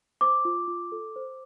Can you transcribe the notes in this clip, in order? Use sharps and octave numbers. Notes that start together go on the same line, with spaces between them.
C5 D6
F4
F4
A4
C5